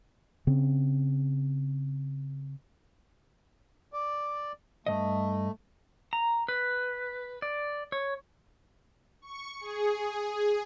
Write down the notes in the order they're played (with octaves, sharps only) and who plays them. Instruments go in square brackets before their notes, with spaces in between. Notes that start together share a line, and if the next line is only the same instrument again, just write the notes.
[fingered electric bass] C#3 C4
[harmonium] D5
[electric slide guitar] G2 D#3 D#5 [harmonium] A3
[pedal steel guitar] A#5
B4
D5
C#5
[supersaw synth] C#6
G#4